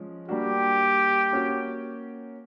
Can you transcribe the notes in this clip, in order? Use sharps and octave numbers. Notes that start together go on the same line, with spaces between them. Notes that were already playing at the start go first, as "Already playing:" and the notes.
Already playing: F3 G#3 C#4
G3 A#3 D4 F#4 G4
A#3 C#4 F#4